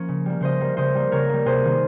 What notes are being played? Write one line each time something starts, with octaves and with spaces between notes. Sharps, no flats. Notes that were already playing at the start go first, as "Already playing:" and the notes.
Already playing: F3 A#3 C#4
C#3
G3 A#3
C#3 C5 D#5
G3 A#3
C#3 C5 D#5
G3 A#3
C#3 A#4 C#5
G3 A#3
C3 G#4 C5
D#3 A#3